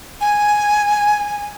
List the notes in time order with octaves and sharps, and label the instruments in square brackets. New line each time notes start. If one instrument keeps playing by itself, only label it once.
[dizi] G#5